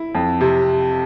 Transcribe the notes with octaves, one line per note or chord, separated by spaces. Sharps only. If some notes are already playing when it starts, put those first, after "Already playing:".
Already playing: E4
F2
C3